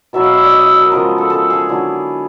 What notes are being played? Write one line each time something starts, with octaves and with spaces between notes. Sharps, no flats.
B2 F#3 B3 E5
F5
E5
D5
D#5
E5
D#5
A#4
C#3 F3 G#3 B3 A#4
A4
A4
G#4
D3 F#3 B3 E4